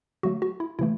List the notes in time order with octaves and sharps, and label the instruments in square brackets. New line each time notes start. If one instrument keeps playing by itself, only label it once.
[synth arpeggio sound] D3 F#3 A3 F#4
F#4
E4
C3 E3 A3 E4